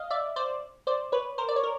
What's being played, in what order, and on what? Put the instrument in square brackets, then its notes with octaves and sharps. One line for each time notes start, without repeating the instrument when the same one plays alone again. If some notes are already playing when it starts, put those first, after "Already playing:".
Already playing: [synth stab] D#5 F5
D5 E5
C5 D5
C5 D5
B4 C#5
A#4 C5
D5
C#5
A#4